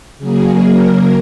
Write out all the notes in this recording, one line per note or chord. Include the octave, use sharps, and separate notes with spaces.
C#3 F#3 A#3 G#4
A#4